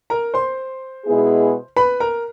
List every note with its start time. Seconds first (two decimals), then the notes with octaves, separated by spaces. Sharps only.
0.10 A#4 A#5
0.34 C5 C6
1.05 B2 G#3 B3 E4 G#4
1.76 B4 B5
2.00 A#4 A#5